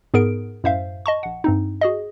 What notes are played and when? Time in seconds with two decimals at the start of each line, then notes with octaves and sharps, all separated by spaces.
0.14 G#2 B3 G#4 A#4 D7
0.64 F#2 A2 C5 E5 F5
1.06 D#5 A5 C#6
1.23 A#1 F#5
1.44 G2 C4 D#4
1.81 F#4 G#4 D#5